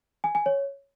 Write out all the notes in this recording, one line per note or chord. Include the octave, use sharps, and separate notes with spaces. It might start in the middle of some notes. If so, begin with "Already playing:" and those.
G#5
G#5
C#5